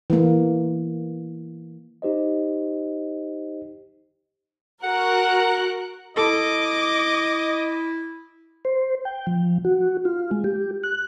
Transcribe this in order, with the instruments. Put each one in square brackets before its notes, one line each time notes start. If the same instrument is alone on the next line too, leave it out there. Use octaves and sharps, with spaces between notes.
[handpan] E3 A#3
[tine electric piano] D#4 G4 C5 D#5
[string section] F#4 A#4 F#6 [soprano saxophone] F#5
[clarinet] E4 [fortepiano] A4 [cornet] D#5 [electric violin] D6
[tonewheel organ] C5
G5
F3
F#4
F4
G#3
G4
F#6